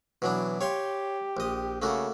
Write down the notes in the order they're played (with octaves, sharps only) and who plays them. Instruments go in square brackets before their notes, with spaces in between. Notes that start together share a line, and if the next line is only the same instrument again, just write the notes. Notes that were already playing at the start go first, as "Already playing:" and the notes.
[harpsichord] B2 F#3 D4 [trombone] E3
[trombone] G4 [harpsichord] C#5 F5 C6
[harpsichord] A#1 D#5
[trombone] C#3 [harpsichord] A3 A#3 F#4